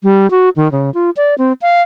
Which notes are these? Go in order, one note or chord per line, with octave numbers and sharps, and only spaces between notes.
G3
F#4
D#3
C#3
F4
D5
C4
F5